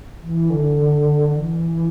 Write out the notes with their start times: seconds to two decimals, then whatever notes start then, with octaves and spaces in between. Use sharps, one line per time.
0.22 E3
0.50 D3
1.33 E3